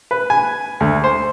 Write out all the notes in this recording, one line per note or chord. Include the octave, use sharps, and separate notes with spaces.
B4
G#5
D2
C5